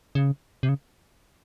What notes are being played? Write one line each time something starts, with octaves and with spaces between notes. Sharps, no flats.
C#3
C3
C#3